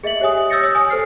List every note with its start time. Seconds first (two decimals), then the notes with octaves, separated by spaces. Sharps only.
0.04 G#4 D#5 E5 B6 F#7
0.20 G4 C#5 E5 G#5 D#6
0.50 D#6 E6 G6 A6 A#6 C#7
0.62 C#5 D#6
0.75 G#5 D#6
0.90 A4 C5 F6 C7